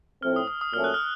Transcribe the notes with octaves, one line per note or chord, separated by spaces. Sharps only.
A2 F3 A3 C4 F6
D#6
D#6
D#6
A#2 F#3 A3 C#4 F6
F#6
F6